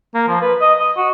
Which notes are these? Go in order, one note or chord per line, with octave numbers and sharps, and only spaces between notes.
A#3
F3
B4
D#5
D#5
F#4